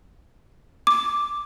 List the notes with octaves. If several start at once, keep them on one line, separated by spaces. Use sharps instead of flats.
D6